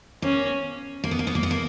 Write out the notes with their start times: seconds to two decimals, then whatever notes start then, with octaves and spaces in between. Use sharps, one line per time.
0.22 A#3 C#4
1.04 A#3
1.11 B3
1.19 A#3
1.27 B3
1.35 A#3
1.43 B3
1.51 A#3